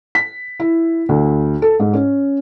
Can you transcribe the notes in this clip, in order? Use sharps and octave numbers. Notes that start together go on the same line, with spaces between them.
B6
E4
D2
A4
G#2
C#4